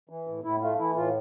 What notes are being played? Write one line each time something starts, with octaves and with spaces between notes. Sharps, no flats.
E3
A2
A2 E4
A3 F4
E3 E4
A2 F4